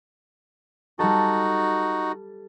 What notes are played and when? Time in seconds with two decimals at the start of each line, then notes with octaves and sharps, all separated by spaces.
0.99 G3 D#4 F#4 A4